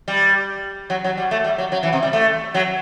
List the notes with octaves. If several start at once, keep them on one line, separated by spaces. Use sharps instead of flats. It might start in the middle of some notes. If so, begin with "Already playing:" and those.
G3
F#3
F#3
G3
A3
G3
F#3
F#3
E3
C3
G3
A3
F#3